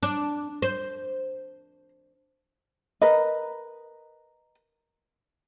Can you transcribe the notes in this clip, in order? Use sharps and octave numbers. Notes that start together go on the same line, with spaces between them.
D4
C5
A#4 B4 D#5